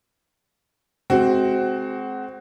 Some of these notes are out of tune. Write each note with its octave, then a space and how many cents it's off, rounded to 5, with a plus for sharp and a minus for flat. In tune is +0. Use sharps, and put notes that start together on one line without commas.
G#3 +35 C4 +0 F#4 +15